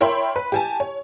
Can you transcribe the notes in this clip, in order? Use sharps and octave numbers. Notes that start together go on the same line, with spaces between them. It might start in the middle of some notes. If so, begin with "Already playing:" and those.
A#4 C#5 E5 G5 B5 C6
B4
G4 G#5 A5
C#5